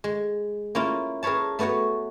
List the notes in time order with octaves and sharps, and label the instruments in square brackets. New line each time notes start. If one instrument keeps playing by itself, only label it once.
[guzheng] G#3
A#3 C#4 E4 F4
G#4 A#4 B4 C#5 A5
A3 B3 F#4 C#5 F#5